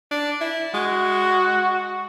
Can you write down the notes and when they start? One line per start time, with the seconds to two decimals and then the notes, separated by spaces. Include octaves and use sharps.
0.11 D4
0.41 E4
0.74 G#3 F#4